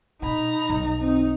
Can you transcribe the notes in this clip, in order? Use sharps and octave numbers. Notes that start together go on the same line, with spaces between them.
B2 C#4 D#4 A#5 B5
B1 G2
C4 D#4